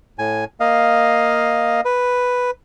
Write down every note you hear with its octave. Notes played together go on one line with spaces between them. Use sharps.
A2 G#5
A#3 D#5 F5
B4